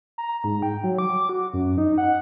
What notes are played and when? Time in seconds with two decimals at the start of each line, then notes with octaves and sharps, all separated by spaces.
0.18 A#5
0.44 G#2
0.62 G5
0.84 F#3
0.98 D6
1.29 F#4
1.54 F#2
1.78 D#4
1.98 F#5